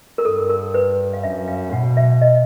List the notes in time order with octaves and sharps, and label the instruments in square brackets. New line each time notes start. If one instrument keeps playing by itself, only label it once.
[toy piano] A#4
[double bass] G2 [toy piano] A4
[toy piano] A4
A#4
B4
F5
[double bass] F#2 [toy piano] E5
[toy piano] F5
[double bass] B2 [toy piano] F#5
[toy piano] E5
D#5